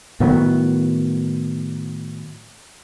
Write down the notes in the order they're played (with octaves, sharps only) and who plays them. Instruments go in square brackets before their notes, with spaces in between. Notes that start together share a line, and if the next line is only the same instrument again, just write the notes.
[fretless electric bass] A2 D#3 F#3 B3